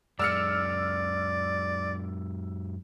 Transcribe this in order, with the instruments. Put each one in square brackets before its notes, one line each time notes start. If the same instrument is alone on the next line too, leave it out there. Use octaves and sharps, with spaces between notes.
[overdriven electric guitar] F#2 G#3 [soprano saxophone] D5 [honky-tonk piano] E6 F6 C#7